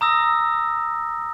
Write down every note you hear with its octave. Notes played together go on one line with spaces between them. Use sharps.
A#5 D#6 E6 A#6